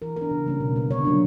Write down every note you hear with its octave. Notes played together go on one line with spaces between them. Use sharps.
E3 A#4
B3 D4 A#4
C#3
G3 A#3 C#4
B2
G3 B3
D3 C#5
F#3 A#3 D4